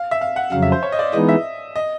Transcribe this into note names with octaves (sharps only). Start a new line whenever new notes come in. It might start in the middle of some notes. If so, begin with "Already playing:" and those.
Already playing: F5
E5
F5
F#5
F2 C#3 F#3 F5
E5
C5
C#5
D#5
D5
E3 G#3 B3 D#4 D#5
E5
D#5